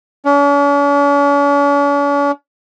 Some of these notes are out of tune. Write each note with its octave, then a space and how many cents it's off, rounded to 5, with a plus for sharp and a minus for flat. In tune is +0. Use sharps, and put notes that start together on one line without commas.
C#4 +45